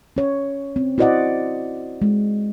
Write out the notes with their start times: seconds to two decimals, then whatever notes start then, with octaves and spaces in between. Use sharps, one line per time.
0.16 C#4 C#5
0.76 C4
0.98 E4 F#4 C5 D5 D#5 F#5
2.02 G#3